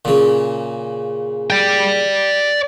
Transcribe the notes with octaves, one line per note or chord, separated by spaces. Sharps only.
A#2 C#3
D5 G5